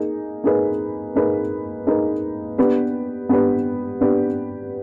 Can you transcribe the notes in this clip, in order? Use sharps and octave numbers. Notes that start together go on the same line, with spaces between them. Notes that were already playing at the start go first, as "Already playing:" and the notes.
Already playing: A#3 D#4 G#4
A#3 D#4 G#4 B4
A#3 D#4 G#4 B4
A#3 D#4 G#4 B4
B3 D4 G4 B4
B3 D4 G4 B4
B3 D4 G4 B4